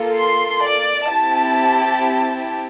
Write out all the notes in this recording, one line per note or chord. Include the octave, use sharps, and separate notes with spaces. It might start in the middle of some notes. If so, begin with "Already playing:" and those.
Already playing: A#3 F4 A4
C6
D5
C4 E4 G4 A5